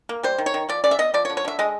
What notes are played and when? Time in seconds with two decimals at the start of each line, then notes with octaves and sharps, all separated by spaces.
0.09 A#3
0.23 G3 C5
0.38 D#3
0.46 C#5
0.54 D#3
0.69 F3 D5
0.84 C#3 D5
0.91 E5
0.99 B3 D#5
1.14 F3 D5
1.25 C#5
1.30 D3
1.37 C#5
1.45 D3 E5
1.59 G#3 D#5